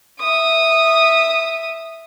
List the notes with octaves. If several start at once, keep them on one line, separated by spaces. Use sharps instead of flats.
E5 D#6